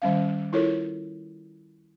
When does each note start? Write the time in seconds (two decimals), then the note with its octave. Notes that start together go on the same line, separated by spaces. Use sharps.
0.02 D#3 G3 C#4 F5
0.53 E4 F4 A4 A#4 C#5